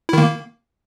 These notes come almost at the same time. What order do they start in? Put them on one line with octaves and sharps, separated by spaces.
E4 D#3 A#3